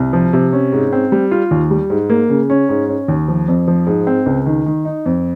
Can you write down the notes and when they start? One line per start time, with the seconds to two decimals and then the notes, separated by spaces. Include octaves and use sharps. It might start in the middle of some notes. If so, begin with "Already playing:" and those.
Already playing: C2
0.13 F3
0.33 C3
0.53 C#4
0.73 G#2
0.93 C4
1.12 G3
1.31 F4
1.51 D#2
1.71 G3
1.90 G#2
2.10 A#3
2.29 C#3
2.50 C#4
2.69 G#2
2.89 C#4
3.08 D#2
3.28 F3
3.48 F2
3.68 F3
3.87 G#2
4.07 C4
4.26 C#2
4.46 D#3
4.66 D#3
4.85 D#4
5.06 F2